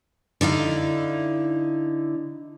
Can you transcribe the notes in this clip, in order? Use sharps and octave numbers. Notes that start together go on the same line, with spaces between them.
D3 D#4 E4 F5